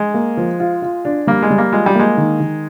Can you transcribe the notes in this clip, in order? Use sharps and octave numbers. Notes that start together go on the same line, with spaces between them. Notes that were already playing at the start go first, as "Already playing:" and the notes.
Already playing: G#3
A#3
F3
F4
F4
D4
G3 A#3
G#3
G3
A#3
G#3 F4
G3
G#3 A#3
D#3
D#3